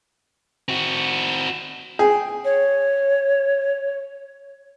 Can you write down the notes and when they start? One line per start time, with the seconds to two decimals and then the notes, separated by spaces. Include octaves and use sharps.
0.69 C4 F#4
1.99 G#4 G5
2.44 C#5